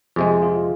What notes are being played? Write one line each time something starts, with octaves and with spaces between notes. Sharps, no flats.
F2 C3 G#3 G#4
F4